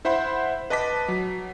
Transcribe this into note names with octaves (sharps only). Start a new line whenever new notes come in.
E4 C5 E5 F#5 B5 C6
B4 D#5 A5 D6 B6
F#3